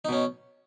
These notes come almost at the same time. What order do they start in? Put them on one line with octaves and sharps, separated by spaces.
D#4 B2 C#4